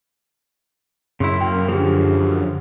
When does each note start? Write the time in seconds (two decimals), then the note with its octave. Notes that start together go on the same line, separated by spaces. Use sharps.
1.20 F#2 C#3 E4 C6
1.41 A#3 G5
1.68 D3 F3 G4 G#4